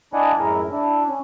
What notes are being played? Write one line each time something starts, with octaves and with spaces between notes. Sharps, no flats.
D4 E4 D5 D#5 F#5 G#5
F#2 A2 G#3 E4 A#4
D4 E4
C#4